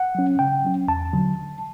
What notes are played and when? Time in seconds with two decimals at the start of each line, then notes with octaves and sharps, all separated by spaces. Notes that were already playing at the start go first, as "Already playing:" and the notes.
Already playing: F#5
0.15 F#3 C#4
0.39 C#3 G5
0.64 F#3 C#4
0.88 E2 A5
1.13 D3 F#3